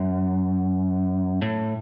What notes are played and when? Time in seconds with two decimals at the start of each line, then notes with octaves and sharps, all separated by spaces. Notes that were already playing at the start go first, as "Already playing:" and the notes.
Already playing: F#2
1.42 A2